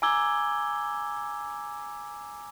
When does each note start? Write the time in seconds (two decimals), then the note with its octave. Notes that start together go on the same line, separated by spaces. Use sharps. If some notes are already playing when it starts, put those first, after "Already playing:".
0.02 G#5 A#5 D6 E6 G#6 G7